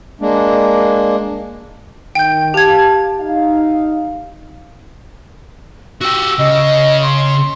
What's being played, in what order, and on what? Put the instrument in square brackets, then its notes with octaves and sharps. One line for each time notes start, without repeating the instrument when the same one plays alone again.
[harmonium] G#3 A#3 D4
[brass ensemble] D#3 [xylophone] G5 G6
[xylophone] G4 G#6 [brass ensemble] F5 A5
[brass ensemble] D#4 F5
[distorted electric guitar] F#4 G4 [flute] E6
[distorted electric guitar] C#3 [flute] D#5
[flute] C6